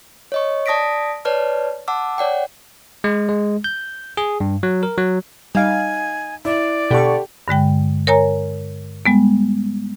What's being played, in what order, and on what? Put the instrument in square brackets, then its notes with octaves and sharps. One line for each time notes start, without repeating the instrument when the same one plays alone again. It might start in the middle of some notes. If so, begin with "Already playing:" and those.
[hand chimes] C#5 D#5 C#6
D5 A5 D#6 A#6 B6 D7
B4 C#5 D5 A5 F6
F#5 A5 D6 E6
C#5 D5 F#5 G5
[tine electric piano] G#3
G#3
G6
G#4
G2
F#3
A#4
F#3
[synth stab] G3 F5 [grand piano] D#4 [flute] G#5
[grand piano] E4 [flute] D5
[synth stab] B2 C#6 [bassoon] D3 [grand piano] G4
[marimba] G2 D3 G#3 G5
A#4 C#5 G#5 A#5
G3 G#3 B3